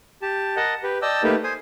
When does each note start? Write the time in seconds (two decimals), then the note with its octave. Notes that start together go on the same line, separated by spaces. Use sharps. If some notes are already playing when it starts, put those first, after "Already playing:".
0.22 G4 A5
0.56 A#4 D#5 F#5 A5
0.83 G4 B4
1.02 D5 D#5 G5 A5 E6
1.23 A3 A#3 D#4 G4 B4
1.44 C5 G#5 D#6